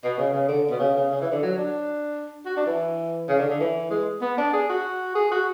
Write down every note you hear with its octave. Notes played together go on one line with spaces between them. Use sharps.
B2
C#3
C#3
D3
B2
C#3
C#3
C#3
E3
D3
F#3
D4
F#4
D4
E3
C#3
D3
D3
E3
G#3
B3
D4
G#4
F#4
G#4
F#4